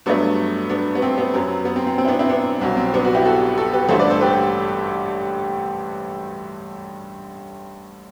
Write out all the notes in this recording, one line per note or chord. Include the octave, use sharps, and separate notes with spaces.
G2 F#3 A3 B3 D4
B3 D4
B3
C4
B3
F#2 F#3 B3
B3
C4
C4
C4
E4
B3 D4
C4 E4
B3 D4
C2 B2 F#3 C4
C4
B3 D4
D4 F#4
E4 G4
F#4 A4
F#4 A4
G4 B4
A1 G2 D3 A3 A4 C5
B4 D5
A4 C5
G4 B4